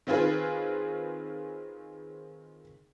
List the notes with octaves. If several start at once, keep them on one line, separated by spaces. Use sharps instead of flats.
D#3 C4 F4 G#4 B4